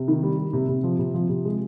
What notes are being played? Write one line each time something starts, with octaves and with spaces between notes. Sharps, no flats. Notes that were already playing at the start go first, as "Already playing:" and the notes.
Already playing: C3
D#3
G3
G3
C3
C3
F3
C3
F3
C3
G#3